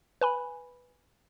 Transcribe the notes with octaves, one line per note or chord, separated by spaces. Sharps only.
B4 G#5 B5